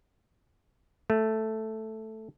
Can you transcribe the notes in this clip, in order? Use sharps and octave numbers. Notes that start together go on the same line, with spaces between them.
A3